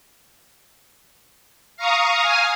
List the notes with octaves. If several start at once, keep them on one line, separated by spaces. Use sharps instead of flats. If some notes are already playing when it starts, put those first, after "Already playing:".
F5 A#5 C#6 D#6
F5 G#5 D#6 F6